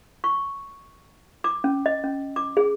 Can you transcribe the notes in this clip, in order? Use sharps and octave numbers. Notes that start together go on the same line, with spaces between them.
C#6
D6
C#4
D#5
C#4
D6
G#4